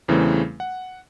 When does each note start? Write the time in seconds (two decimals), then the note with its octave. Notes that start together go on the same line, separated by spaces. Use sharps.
0.08 E2 C#3 E3 G3 A3 C4
0.60 F#5